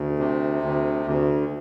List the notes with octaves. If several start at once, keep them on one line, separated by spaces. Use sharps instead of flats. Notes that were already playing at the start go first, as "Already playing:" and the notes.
Already playing: D2
C3
D2
D2